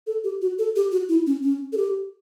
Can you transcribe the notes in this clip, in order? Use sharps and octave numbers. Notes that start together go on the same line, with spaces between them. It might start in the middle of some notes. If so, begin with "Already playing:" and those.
A4
G4
F#4
A4
G4
F#4
E4
C#4
C#4
A4
G4